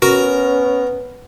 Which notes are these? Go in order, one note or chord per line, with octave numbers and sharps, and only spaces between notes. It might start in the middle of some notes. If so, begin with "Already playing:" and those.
B3 C#4 F#4 A#4